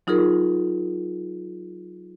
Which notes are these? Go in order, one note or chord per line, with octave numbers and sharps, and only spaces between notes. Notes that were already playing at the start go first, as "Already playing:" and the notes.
F#3 D#4 F4 G#4 A#4